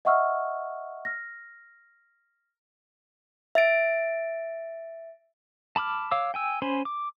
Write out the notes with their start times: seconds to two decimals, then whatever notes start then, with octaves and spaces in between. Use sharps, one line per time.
0.05 D#5 E5 F#5 C#6 E6 F6
1.05 F6 A#6
3.55 E5 A6 D7
5.76 A5 B5 D6 F6
6.11 C#5 F5 D6 E6
6.34 G5 G#5 E6
6.62 C#4 C5 G#5 B5 C6
6.85 D6